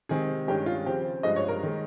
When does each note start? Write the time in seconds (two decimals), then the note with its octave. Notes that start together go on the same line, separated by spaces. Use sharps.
0.09 C3 D#3 G#3 C4 G#4
0.47 G2 D#3 G#3 C#4 G4
0.66 F4
0.86 C#3 F3 C4 G4
1.23 G2 F3 G#3 D#5
1.36 C#5
1.48 A#4
1.63 D#3 G#3